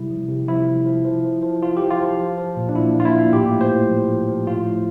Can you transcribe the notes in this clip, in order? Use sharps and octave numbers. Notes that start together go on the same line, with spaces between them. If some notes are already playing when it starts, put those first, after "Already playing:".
Already playing: C3 G3 E4
F3
C3
F3 E4
C3
F3
F3
F3
F3
F3 F4
F3 G4
F4
F3
F3
F3
A#2
D4
A#2 E4
A#2 F4
E4
A#2
A2 G4
A2
C5
A2
F3
F3
F3
A2 F4
A2